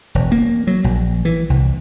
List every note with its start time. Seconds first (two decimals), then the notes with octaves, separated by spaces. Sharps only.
0.15 E1
0.32 A#3
0.67 F#3
0.84 A#1
1.25 E3
1.50 C2